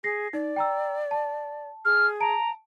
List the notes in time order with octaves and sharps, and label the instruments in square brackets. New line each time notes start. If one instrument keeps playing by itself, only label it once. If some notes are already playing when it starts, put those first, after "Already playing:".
[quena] G#4 [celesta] A#6 C7
[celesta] D#4 [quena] D5
[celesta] G5 A#5 E6
A5
[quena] G#4 [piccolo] F6
[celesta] A5 D7 [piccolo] A#5